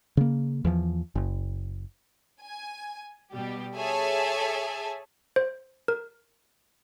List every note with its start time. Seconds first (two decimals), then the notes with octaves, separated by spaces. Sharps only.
0.17 C#3 A#3
0.65 E2 F3
1.15 F#1
2.40 G#5
3.31 B2 G3 G4
3.76 G#4 A4 C#5 E5 G#5 A5
5.36 C5
5.88 A#4